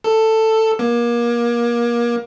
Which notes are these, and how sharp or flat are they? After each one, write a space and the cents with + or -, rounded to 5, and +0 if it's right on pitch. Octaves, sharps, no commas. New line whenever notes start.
A4 +10
A#3 +30